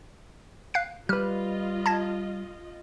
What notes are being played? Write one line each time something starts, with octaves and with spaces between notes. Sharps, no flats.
F5 F#6 C7
G3 F4 B4 D#5 F6
A5 G#6 A#6